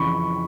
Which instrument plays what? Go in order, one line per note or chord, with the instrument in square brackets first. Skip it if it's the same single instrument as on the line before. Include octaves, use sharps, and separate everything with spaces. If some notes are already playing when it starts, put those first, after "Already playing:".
Already playing: [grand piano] F2 C#3 E3 B5 C#6